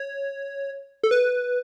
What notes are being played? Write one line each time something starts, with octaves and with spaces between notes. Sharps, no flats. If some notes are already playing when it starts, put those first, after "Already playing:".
Already playing: C#5
A4
B4